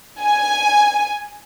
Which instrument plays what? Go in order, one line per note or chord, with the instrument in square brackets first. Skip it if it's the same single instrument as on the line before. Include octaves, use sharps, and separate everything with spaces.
[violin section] G#5